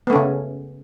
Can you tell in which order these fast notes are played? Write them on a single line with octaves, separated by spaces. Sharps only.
B3 A3 C#4 C#3